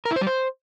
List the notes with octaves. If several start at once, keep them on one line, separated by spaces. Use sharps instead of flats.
A#4
E4
C5
G3
C5